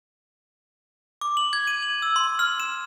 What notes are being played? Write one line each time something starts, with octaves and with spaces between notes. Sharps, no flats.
D6
F#7
G#6
D#7
F#7
E6
C6
F6
E7